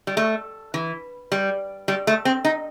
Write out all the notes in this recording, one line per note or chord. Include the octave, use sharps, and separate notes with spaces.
G3
A3
E3
G3
G3
A3
C4
D#4